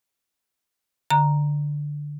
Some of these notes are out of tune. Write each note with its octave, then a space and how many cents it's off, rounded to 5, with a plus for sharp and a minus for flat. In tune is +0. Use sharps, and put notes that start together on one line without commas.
D3 +0 A#5 +0